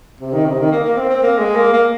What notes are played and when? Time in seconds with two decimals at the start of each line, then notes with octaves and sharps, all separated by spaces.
0.21 C3
0.33 D#3
0.46 C3
0.59 D#3
0.71 A#3
0.84 A#3
0.97 C4
1.10 C4
1.23 A#3
1.39 G#3
1.56 A#3
1.73 A#3